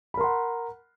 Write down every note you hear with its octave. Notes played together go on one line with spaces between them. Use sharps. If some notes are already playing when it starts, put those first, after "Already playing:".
A#4 F#5 B5 C6